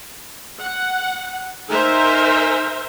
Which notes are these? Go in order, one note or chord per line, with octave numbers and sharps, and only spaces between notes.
F#5
D#4 A#4 C5 E5 G#5